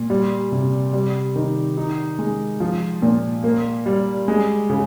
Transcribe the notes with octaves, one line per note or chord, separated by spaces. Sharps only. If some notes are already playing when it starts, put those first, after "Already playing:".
Already playing: A#2
G3
C3
G3
D#3
D#4
G#3
F3
A#2
A#3
G3
G#3
C#3